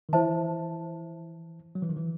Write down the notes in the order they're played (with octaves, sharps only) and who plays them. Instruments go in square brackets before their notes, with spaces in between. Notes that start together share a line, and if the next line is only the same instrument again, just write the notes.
[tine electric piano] D#3
[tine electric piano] E3 [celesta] E4 C5 E5 A5
[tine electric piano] F#3
E3
D#3
E3